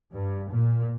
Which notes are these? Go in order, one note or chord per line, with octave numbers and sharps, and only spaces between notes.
G2
A#2